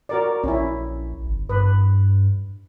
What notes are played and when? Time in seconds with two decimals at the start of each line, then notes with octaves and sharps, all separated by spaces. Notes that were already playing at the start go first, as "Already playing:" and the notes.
0.09 F#4 A#4 D5
0.44 A#1 C#4 E4
1.27 G1
1.49 G2 B4